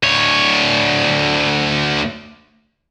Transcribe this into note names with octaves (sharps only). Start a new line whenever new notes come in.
D2 C#5